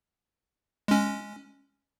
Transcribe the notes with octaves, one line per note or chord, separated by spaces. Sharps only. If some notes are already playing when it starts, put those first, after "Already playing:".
G#3 C#4